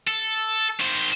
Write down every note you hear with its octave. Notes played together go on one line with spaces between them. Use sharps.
A4
D#3 C5